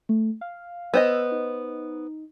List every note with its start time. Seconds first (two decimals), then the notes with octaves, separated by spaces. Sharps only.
0.09 A3
0.41 F5
0.94 B3 C5 D#5 E6
1.32 D#4